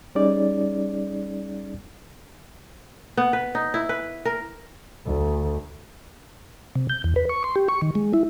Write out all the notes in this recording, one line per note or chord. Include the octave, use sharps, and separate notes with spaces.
G3 C#4 D#4 G#4 D5
B3
B4
D#4
E4
B4
A#4
D2
C3
G6
E2
B4
C#6
C6
G4
C#6
D#3
G#3
E4